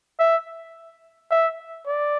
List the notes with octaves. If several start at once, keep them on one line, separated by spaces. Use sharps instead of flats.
E5
E5
D5